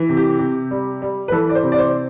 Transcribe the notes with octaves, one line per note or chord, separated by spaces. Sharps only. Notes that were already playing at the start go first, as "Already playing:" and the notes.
Already playing: E3
C3
G4
C3
G3
G3
B4
E3 A4
D5
C5
C3
D5
C5